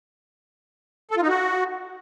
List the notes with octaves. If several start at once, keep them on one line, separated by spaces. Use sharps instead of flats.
A4
F4
D#4
F#4